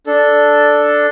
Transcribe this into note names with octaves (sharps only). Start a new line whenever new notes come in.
D4 A4